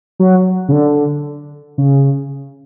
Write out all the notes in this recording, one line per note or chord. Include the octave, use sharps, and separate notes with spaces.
F#3
C#3
D3
C#3